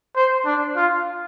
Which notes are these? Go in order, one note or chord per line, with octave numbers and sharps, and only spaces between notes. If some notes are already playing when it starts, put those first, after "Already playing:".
C5
D4
F4